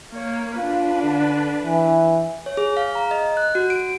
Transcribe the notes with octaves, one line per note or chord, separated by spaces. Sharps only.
A#3 C#5
D4 F4 B4
D3
E3
C#5
G#4
F5
A#5
D#5
F#6
F#4
D7